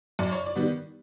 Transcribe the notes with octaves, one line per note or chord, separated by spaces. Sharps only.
F#2 D5
C#5
D5
D#3 G3 B3